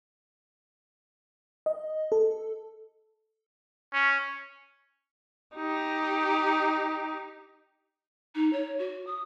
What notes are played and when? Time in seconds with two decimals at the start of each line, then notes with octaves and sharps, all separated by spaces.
1.66 D#5
2.12 A4
3.93 C#4
5.56 D#4 G4
8.35 D#4
8.52 C#5
8.79 F#4
9.07 D#6